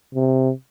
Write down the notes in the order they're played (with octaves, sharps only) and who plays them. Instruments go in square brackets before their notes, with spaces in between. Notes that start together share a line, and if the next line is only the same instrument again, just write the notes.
[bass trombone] C3